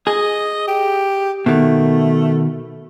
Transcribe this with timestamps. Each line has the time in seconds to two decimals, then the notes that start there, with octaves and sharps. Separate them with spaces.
0.07 G#4 D#5
0.68 G4
1.46 B2 D#3 A3